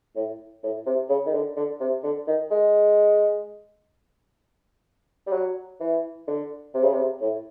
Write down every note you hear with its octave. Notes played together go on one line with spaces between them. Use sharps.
A2
A2
C3
C#3
D#3
D3
D3
C3
D3
D#3
G#3
G3
F#3
E3
D3
C3
C#3
C3
A2